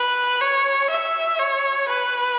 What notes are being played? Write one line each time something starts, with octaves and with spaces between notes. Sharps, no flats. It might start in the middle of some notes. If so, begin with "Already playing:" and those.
Already playing: B4
C#5
E5
C#5
B4